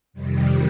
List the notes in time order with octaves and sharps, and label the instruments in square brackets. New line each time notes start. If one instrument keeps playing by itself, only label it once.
[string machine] F2 C3 D#3 G3